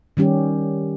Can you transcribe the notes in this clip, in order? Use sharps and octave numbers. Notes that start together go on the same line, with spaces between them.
D#3 G3 C#4 G4